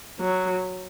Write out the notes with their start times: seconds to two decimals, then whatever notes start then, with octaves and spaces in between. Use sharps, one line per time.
0.20 F#3